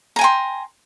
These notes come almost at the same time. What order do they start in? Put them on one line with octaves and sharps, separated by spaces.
A#5 G#5 G5 C6